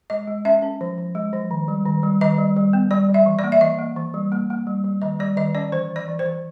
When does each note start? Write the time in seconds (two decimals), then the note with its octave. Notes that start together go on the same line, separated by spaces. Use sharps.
0.10 G#3 D#5
0.28 G#3
0.45 C#4 E5
0.62 C#4
0.81 F3
0.98 F3
1.15 G#3
1.33 F3
1.51 D#3
1.68 G3
1.86 D#3
2.03 G3
2.21 D#3 D#5
2.38 G3
2.56 G3
2.73 B3
2.91 G3 D5
3.09 G3 E5
3.26 E3
3.39 D5
3.44 A#3
3.52 E5
3.61 E3 D#5
3.79 A#3
3.97 E3
4.14 G3
4.32 A#3
4.50 A#3
4.67 G3
4.84 G3
5.02 D#3 D#5
5.19 G3 D5
5.37 D#3 D#5
5.55 C#4 D5
5.72 E3 C5
5.90 E3
5.96 D5
6.08 E3
6.19 C5
6.26 E3